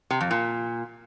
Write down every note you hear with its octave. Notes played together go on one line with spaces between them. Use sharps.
C3
F2
A#2